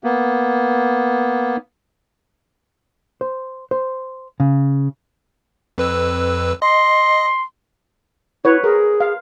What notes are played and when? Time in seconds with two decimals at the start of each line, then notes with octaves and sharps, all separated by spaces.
0.04 A#3 B3
3.21 C5
3.71 C5
4.40 C#3
5.78 F2 B4 E6
6.62 D#5 C6
8.45 E4 B4 C#5
8.64 G#4 A#4
9.00 F5